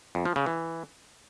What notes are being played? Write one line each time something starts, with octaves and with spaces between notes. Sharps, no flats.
F2
F3
C#3
E3